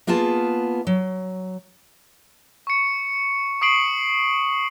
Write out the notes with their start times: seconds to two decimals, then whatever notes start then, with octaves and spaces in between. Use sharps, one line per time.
0.07 A#3 B3 F4 G#4 A5
0.87 F#3
2.67 C#6 C#7
3.62 C#6 D#6 C7 D7 F#7